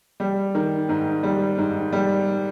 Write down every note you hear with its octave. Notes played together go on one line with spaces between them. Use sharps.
G3
D#3
G#2
G3
G#2
G3